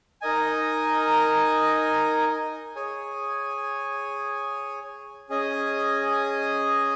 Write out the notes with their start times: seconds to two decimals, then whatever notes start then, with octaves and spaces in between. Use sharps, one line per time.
0.22 D#4 A#4 D#5 G#5
2.76 G#4 C#5 G#5
5.30 C#4 G#4 D#5 G#5